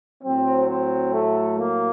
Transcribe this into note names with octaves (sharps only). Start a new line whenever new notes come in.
A2 F#3 C4
C4
A3
A#3